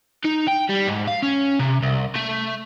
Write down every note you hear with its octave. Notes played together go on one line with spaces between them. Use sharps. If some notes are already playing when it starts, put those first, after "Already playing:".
D#4
G5
G3
G#2
F5
C#4
C3
C2
A3